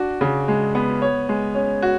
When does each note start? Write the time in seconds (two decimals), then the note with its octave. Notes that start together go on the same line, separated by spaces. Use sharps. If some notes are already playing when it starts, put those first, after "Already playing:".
Already playing: D4 F#4
0.21 C#3
0.48 G#3
0.75 B3
1.02 C#5
1.29 G#3
1.55 C#4
1.82 F#4